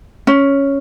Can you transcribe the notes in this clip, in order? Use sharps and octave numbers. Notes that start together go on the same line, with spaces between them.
C#4